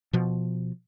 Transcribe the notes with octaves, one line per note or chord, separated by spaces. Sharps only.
B2 F3